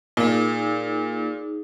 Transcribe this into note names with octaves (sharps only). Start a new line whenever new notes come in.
A#2 D#4 G#4